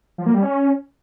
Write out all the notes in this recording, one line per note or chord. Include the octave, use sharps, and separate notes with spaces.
F3
A#3
G3
C#4